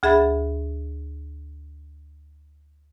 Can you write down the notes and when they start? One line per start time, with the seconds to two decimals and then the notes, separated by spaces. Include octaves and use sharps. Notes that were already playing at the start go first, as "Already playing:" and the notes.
0.03 D2 G#4 E5 B5 A6